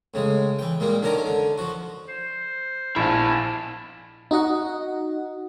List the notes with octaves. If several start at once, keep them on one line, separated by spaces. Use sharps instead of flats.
A2 C#3 G#3
E3 G5
A#2 G3 G#3 A#3
D3 D#3 C#4 A#4 A#5
D3
F3 F#4
C5
A#1 E4 F5 A5
D#4 F#4 D#5 F#5